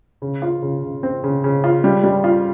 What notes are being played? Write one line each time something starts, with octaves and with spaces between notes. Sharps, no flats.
C#3
F4
C#3
C#3
C4
C#3
C#3
F4
G3
G3
F4